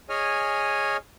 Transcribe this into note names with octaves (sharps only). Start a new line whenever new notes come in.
G#4 C#5 D#5 G#5 F6